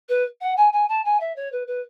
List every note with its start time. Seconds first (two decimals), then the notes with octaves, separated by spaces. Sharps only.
0.09 B4
0.41 F#5
0.57 G#5
0.73 G#5
0.89 A5
1.05 G#5
1.20 E5
1.36 C#5
1.52 B4
1.67 B4